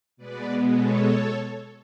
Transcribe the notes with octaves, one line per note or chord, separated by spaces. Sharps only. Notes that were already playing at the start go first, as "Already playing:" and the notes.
B2 G#3 B3 B4 D5
A4 C#5